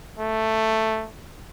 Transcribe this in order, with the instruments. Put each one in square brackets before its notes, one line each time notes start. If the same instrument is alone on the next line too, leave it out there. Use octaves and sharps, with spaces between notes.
[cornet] A3